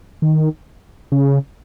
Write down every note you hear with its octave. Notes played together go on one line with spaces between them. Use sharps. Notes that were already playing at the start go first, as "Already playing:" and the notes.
D#3
C#3